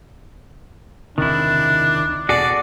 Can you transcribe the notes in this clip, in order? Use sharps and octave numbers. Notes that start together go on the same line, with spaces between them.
E1 C#2 C3 D#3 D4 E4
E1 B2 F#4 G#4 A4 D5